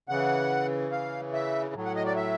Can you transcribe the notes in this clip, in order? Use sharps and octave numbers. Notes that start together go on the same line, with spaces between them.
C#3 E3 F#5
F5
E5
A2 F#3
F#5
D#5
D5
E5